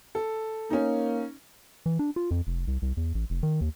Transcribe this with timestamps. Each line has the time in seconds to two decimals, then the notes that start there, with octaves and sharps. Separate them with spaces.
0.15 A4
0.70 A#3 C#4 D#4
1.86 E3
1.99 D4
2.16 F4
2.31 F2
2.47 F1
2.67 C2
2.82 C2
2.97 E2
3.15 A1
3.30 F1
3.43 D#3
3.61 D#2